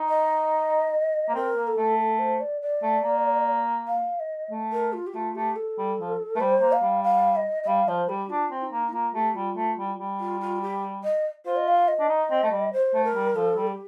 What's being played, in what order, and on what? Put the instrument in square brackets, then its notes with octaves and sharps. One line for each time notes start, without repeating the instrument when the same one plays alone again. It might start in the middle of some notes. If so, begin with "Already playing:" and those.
Already playing: [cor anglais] D#4
[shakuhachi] D#5
[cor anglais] A#3
[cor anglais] C4 [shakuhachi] A#4
[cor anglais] A#3
[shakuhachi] A4
[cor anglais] A3
[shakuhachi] A4
C5
D5
D5
[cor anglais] A3
A#3
[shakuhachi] F5
D#5
[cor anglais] A3
[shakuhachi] A#4
F4
G4
[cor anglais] A3 [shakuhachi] F4
[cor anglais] A3 [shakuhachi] G4
[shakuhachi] A4
[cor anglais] G3
F3
[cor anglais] A3 [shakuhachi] A#4
[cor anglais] G3 [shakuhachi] C5
[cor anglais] A#3
[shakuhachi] F5
[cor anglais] G3
[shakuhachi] F5
D#5
D#5
[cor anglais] G3 [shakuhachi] F5
[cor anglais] F3 [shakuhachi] C5
[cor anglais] G3 [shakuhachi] G4
[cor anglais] D4 [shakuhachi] F4
[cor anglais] C4
[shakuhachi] D#4
[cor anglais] A#3
[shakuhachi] D#4
[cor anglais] A#3 [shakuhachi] F4
[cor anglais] A3 [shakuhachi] G4
[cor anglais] G3 [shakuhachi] F4
[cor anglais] A3
G3
G3
[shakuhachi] F4
F4
G4
D#5
[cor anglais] F4 [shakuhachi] C5
[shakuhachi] D#5
F5
D#5
[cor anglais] D4
D#4
C4
A3
G3
[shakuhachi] C5
[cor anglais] A3
[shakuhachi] A#4
[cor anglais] G3
[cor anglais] F3 [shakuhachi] A4
[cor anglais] G3
[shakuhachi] G4